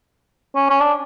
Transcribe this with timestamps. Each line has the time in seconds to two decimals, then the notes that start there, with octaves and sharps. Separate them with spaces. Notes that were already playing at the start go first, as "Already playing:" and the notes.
0.55 C#4
0.70 C#4
0.80 D4